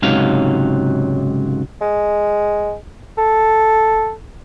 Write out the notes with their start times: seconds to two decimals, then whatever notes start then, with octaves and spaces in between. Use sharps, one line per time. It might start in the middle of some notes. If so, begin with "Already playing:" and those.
0.02 C#2 G#2 C3 F#3 F5
1.81 G#3
3.18 A4